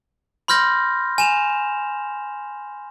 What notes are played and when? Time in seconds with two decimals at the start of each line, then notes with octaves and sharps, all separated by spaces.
0.48 B5 C6 F6 G6 A#6
1.18 G#5 E7 F7